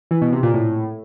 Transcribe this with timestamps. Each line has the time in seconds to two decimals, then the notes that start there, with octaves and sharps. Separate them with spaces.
0.11 E3
0.22 B2
0.32 C3
0.43 A#2
0.54 A2